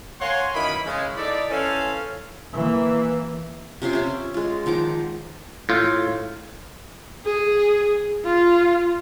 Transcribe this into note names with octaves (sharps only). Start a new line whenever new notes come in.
A#4 C#5 F5 F#5 G#5 C6
F#2 D#3 E3 E4 B5
C#3 G#3
D#4 E4 A4 D5
E3 C#4 A4 C5 F5 G#5
E3 A#3
C3 C#4 F4 C6
C#4 E5
G#3 F4
D#3 F3 F#5 D6
A2 F4
G#4
F4